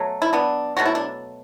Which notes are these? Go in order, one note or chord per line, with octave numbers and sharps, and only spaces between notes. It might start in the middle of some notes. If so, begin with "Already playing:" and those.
Already playing: B2 F#3 A3
E4
B3 D4
B2 F#3 A3 F#4
E4
D4